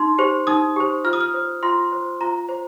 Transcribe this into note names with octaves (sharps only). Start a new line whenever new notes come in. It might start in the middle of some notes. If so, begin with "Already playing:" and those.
Already playing: D#4 C6
G4 C5
D#4 D#6
G4 C5
F4 F6
D#6
F6
C5
F4 C6
C5
F4 A#5
C5